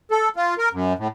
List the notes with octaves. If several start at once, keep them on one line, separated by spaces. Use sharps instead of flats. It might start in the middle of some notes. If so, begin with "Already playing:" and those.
A4
F4
A#4
F#2
A2